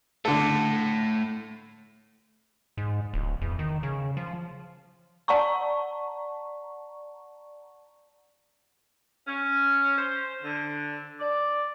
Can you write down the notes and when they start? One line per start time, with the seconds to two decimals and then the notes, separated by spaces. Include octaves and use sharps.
0.25 A2 D3 A4
2.77 G#2
3.14 D1
3.41 E2
3.59 D#3
3.83 C#3
4.17 F3
5.28 D5 F#5 A5 A#5 C#6
9.28 C#4
9.98 C5
10.44 D3
11.20 D5